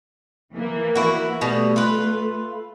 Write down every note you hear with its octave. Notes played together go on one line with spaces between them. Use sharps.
E3 A#3
E4 F#4
B2 G3 A3
F4 B4